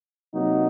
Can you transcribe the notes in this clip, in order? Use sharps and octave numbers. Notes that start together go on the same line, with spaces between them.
C3 F#3 A#3 D#4 F#4